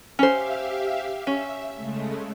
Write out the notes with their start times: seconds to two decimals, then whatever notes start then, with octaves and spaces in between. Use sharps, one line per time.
0.19 C#4 G4 C5 E5 F5
1.27 C#4 E5
1.76 C#3 G#3 A3